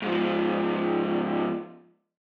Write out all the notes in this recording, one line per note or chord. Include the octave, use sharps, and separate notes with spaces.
G#2 F3